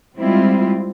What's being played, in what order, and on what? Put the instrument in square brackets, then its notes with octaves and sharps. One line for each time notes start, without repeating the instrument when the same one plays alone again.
[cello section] G3 G#3 C4 E4 F4